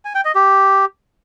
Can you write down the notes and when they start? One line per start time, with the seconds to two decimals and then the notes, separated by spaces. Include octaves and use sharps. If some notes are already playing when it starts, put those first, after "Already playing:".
0.05 G#5
0.15 G5
0.25 D#5
0.35 G4